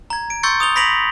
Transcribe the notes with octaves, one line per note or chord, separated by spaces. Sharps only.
A#5 G#6
D7
C6 C#6 E6 G6 A6 C#7
D#6 F7 G7
B5 A#6 B6 D7 F7 F#7